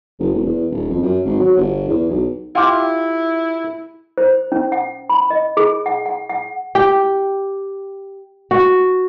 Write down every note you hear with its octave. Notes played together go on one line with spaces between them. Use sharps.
F#1
E1
E2
D#1
F2
F#2
G#1
F#3
G1
E2
B1
E4 F4 G4
C5
C#4
F#5
B5
D#5
G#4
F#5
F#5
F#5
G4
F#4